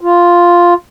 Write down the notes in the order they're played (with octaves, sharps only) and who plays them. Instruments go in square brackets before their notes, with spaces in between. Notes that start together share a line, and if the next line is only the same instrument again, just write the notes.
[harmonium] F4